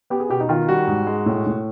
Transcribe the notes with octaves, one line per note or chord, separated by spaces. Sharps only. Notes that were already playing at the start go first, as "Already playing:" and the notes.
B3 G4
G#4
B2 G4
D#4
D#3 F4
G3 F#4
G#2
G#3
A2
A2